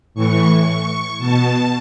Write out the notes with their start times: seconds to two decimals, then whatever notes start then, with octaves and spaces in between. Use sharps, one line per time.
0.14 A2 E3 C#6
1.19 B2 A5